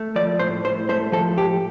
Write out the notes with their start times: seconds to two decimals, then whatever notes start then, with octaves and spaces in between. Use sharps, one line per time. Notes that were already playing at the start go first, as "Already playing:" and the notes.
Already playing: A3
0.16 F3 D5
0.39 A2 C5
0.64 A2 C5
0.89 A3 C5
1.12 F3 A4
1.36 A2 G4